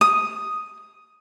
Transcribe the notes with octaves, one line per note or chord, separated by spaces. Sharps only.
D#6